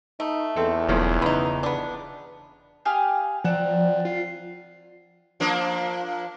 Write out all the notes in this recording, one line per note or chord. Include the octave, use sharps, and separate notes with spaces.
A3 D#4
E2 C4 A4
E1 B1 F3 C#4
C#3 B3 D#4
B3 D4
G4 G#4 F5
F3 C4 D5 F#5 A#5
F4 C7
F3 A#3 D4